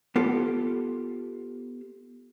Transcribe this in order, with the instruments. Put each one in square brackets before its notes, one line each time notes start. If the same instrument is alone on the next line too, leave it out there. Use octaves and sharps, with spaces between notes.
[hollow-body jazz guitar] B3 F4 G4 A4